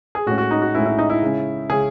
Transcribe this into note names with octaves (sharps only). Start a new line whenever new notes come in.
G#4
A2 G#3 C#4 F#4
F#4
D#4
F#4
A2 G#3 C#4 E4
E4
D#4
E4
C#3 G#3 C#4
C#3 G#3 C#4 G#4